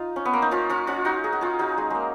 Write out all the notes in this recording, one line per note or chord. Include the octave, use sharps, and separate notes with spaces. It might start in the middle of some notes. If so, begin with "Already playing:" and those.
Already playing: D#4 F4
C#4
B3
A#3
D#4
C#4 F4
C#4 F4
C#4 F4
D#4 F#4
G#4
F#4
F4 G#4
D#4 F#4
G#3
G#3 A#3